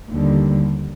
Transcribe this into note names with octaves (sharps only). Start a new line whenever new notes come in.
D#2 D3 G3